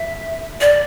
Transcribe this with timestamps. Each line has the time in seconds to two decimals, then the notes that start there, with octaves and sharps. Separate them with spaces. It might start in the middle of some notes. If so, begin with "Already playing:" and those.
Already playing: E5
0.61 D5